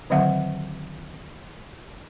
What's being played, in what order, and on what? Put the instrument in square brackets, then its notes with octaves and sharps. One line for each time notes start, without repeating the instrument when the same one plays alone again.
[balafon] D3 D#3 F#3 C4 E5 F#5